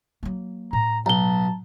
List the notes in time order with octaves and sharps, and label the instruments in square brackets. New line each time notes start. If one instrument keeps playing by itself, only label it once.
[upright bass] F#3 A#3
[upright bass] A2 [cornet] A#5
[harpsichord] B1 [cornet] A5 [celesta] A#5 G7